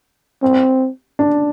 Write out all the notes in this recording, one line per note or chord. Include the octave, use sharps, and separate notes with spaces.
C4
D4